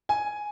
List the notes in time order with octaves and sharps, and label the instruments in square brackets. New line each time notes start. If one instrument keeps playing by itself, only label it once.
[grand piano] G#5